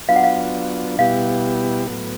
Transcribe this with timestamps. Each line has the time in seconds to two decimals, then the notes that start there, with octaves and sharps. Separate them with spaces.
0.09 F#3 B3 D4 F4 F5
0.16 F#5
0.24 F5
0.99 B2 G3 B3 E4 G4 F5
1.87 A2 F#3 B3